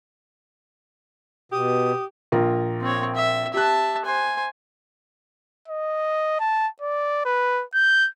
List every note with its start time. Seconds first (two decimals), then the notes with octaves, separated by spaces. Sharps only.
1.52 B2 G4 D#6
2.32 A#1 F4 A#4
2.81 C4 C#5
3.15 E5
3.54 G4 E5 A5 F#6
4.05 C5 G#5
5.68 D#5
6.40 A5
6.81 D5
7.25 B4
7.75 G6